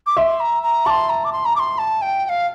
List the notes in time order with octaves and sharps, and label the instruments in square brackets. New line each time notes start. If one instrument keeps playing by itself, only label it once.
[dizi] D6
[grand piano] E5 [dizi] C6
[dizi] A#5
A#5
[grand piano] A5 [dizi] D6
[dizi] C6
A#5
D6
C6
A#5
D6
C6
A5
G5
G5
F5